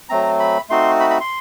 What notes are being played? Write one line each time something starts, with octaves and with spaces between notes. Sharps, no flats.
F#3 A3 C4 A#5
B5
A3 C4 D#4 F#4 C6
B5
B5
C6